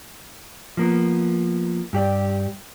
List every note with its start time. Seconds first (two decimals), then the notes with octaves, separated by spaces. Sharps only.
0.77 F3 A#3 B3
1.93 G2 G4 D5